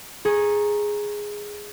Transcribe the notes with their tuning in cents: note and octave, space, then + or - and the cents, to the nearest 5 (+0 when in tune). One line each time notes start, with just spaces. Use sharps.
G#4 +0 A#5 +0 C#6 -20